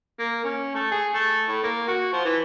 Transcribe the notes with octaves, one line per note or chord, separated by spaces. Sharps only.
A#3
C#4
A3
G#4
A3
A2
A#3
F#4
F3
E3